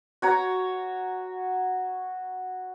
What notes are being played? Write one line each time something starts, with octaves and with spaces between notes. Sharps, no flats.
F#4 C#5 A#5